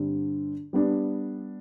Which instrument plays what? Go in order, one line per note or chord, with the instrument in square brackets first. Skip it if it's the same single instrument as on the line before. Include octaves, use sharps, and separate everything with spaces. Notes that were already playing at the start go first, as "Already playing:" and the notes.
Already playing: [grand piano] G2 D3 G3 C4
G3 B3 D4